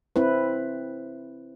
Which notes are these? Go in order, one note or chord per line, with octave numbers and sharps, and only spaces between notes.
C4 E4 B4